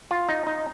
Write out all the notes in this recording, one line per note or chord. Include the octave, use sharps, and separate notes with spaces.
F4
D#4
D#4